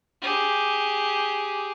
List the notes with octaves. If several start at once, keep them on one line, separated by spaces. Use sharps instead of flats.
G4 G#4